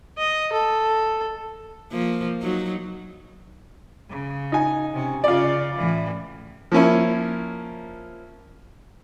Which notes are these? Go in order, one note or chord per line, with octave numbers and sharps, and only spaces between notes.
D#5
A4
F3 A#3
F#3 D#4
C#3
D#4 G#5
C3 C#4
C#3 C#4 F4 D5
A2 E3
F3 A#3 C#4 E4